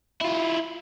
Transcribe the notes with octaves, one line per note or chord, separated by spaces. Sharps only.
E4 F4